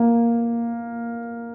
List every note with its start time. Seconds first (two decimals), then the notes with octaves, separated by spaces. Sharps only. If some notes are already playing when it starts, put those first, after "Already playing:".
Already playing: A#3